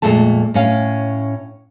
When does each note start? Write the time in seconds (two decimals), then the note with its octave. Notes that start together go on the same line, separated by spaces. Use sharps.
0.02 F2 A#2 G#3 A3 A5
0.54 A2 C#4 F5